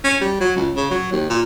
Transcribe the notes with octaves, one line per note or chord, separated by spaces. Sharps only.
C#4
G3
F#3
C#2
C#3
F#3
D#2
A#2